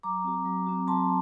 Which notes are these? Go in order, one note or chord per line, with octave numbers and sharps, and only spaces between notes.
F#3 A#5 D6
C4 F#4
F#3
C4 F#4
F#3 A5 C6